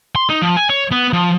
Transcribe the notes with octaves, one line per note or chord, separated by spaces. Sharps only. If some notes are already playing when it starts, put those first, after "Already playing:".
C6
D#4
F3
G#5
C#5
B3
F3